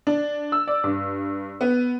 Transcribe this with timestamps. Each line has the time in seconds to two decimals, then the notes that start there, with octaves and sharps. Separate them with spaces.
0.07 D4
0.52 E6
0.67 D5
0.84 G2
1.61 B3